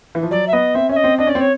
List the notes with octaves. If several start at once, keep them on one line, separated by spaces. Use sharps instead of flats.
E3
F3
F#3 D5
E5
B3 D#5
C4 E5
C#4 E5
D#5
C4
D4 D#5
C#4 D5
C4
C#5